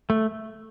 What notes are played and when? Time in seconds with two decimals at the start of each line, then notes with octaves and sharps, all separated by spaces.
0.10 A3